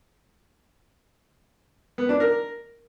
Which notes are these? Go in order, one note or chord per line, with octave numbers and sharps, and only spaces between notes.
B3
D4
A#4